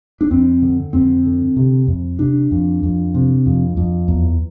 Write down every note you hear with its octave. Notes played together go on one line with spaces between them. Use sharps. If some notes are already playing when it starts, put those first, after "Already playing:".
D4
F2 C4
D3
F2 C4
D3
C3
F2
C3 D4
F2
F2
C3
F2
F2
E2